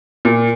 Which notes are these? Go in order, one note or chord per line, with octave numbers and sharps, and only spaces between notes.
A#2